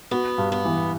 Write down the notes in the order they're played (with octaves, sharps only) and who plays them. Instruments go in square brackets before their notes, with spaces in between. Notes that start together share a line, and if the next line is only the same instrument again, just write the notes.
[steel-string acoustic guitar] B3 [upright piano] F#4
[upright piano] G2
[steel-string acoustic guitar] B3
[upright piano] E3